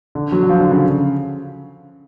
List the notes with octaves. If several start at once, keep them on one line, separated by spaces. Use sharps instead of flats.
D3
F#3
D3
F3
D3
C#3